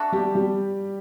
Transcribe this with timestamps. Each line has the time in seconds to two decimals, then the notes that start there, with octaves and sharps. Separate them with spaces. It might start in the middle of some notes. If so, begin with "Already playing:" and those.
Already playing: A3 D4 F#4 A4
0.12 G3 G4
0.35 G3 G4